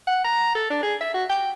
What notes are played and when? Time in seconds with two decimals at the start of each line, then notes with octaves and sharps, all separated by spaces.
0.07 F#5
0.25 A#5
0.55 A4
0.70 D4
0.83 G#4
1.01 E5
1.14 F#4
1.30 G5